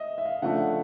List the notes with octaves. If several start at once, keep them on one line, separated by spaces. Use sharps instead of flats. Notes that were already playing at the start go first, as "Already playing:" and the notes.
Already playing: D#5 E5
E5
F5
C#3 F3 A3 D4 F#5